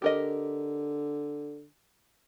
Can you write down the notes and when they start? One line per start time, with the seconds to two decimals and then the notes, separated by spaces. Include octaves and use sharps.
0.02 D3 G4 A#4 D#5